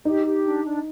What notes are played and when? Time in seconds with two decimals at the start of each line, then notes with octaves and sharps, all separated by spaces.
0.05 D#4 G4
0.25 G4
0.43 D4
0.63 D4